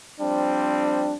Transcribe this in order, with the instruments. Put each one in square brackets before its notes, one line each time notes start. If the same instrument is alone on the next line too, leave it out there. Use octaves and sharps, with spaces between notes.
[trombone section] F3 G3 C4 [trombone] D4